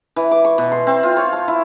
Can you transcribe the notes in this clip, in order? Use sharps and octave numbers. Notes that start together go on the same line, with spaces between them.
E3
D6
C#6
B2
C6
C4
F4
C#5
A5
E4